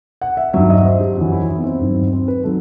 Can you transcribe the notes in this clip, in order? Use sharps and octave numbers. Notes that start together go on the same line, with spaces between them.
F#5
E5
G2 D#3 F#3 E5
D#5
C5
G4
F#2 E3 F#4
E4
D#4
B3
C4
G2 D#3 F#3
C4
B4
D#3 F#3 A4